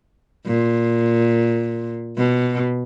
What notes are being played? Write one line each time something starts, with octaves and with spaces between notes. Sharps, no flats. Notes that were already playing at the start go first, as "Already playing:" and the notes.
A#2
B2